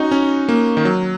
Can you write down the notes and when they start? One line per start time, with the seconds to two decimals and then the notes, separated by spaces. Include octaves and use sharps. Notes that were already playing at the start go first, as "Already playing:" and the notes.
Already playing: C#4 D#4 F#4
0.11 C#4
0.49 A#3
0.77 D#3
0.85 F#3